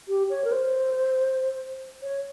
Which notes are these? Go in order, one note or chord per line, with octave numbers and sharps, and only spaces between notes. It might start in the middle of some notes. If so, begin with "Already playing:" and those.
G4
C#5
A#4
C5
C#5